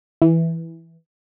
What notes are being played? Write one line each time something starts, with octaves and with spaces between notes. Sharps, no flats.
E3